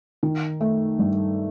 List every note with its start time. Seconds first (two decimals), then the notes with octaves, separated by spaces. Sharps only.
0.23 D#3
0.61 A3
0.99 G2